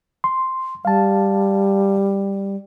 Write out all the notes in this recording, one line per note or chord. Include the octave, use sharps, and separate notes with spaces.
C6
G3 F5 A5